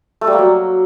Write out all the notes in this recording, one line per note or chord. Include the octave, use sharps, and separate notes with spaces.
A3
G3
A#3
F#3